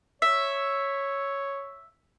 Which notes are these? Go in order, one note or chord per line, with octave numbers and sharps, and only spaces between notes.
C#5 E5